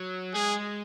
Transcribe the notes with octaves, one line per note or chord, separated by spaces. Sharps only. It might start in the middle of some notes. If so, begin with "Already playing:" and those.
Already playing: F#3
G#3 G#4